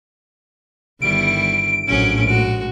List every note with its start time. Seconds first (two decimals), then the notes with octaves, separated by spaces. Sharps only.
1.02 G1 D#3 G3 E4 D7
1.87 A#1 A2 F#3 C#4 G#4
2.24 G#3 F#4